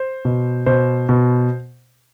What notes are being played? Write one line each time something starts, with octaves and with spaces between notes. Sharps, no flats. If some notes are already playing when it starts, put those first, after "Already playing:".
Already playing: C5
B2
B2 C5
B2